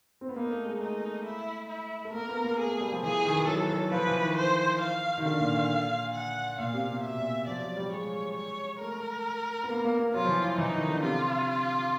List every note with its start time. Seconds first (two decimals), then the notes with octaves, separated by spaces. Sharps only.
0.21 C4
0.29 B3
0.36 A#3 D#4
0.51 A3
0.66 G#3
0.81 A3 D#4
1.25 E4
1.69 E4
2.05 A3
2.13 A#3 A#4
2.29 B3
2.44 A#3
2.58 A3 G#4
2.70 A3
2.81 G3
2.92 F3
3.03 E3 G#4
3.25 D#3
3.36 E3
3.47 F#3 A4
3.69 F#3
3.92 F3 B4
4.07 E3
4.21 D#3
4.36 C5
4.81 F5
5.18 D#3
5.25 D3 F5
5.40 A#2
5.55 A#2
6.14 F#5
6.59 A#2 F5
6.73 C3
6.88 C3
7.03 B2 E5
7.18 A#2
7.47 F3 D5
7.62 F#3
7.77 G3
7.92 G#3 C#5
8.36 C#5
8.80 A3 A#4
9.63 B3
9.70 A#3
9.84 A#3
9.99 A#3
10.14 F#3 F4
10.24 F3
10.29 E3
10.43 E3
10.58 E3 D#4
10.73 D#3
10.88 D3
11.02 C3 F4